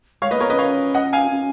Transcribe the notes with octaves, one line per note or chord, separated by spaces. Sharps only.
G#3 C#5 F5
A#3 B4 D#5
B3 A#4 C#5
C#4 B4 D#5
C#5 F5
D#5 F#5
F5 G#5
C#4